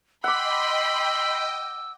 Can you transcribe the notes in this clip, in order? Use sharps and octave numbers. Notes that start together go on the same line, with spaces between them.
D#5 F#5 G5 B5 C6 D6 E6